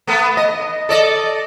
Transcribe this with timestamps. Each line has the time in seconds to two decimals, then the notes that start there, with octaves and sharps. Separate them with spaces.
0.07 A3 B3
0.37 D#5
0.89 A4 D5 D#5